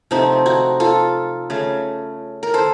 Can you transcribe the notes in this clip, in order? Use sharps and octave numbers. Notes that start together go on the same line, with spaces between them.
C3 F3 A3 C4 D#4
D#4 F#4
F4 A4
C#3 A3
A#4
A4 C5